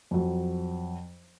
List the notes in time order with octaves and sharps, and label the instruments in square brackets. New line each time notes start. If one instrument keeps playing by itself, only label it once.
[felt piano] F2 F#3